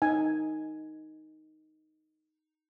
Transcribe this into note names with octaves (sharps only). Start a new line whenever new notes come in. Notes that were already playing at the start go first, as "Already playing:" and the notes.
D#4 G#5